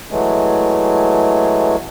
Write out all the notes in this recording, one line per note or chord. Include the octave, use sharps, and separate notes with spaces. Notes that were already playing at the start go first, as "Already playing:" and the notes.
E3 F#3 G#3 A3